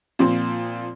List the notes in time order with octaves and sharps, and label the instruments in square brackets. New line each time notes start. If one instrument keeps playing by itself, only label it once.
[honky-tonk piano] A#2 F3 C4